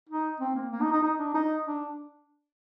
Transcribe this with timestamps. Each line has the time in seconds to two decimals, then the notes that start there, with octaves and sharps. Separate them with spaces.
0.09 D#4
0.40 C4
0.56 A#3
0.72 A#3
0.82 D#4
0.92 D#4
1.03 D#4
1.19 D4
1.34 D#4
1.66 D4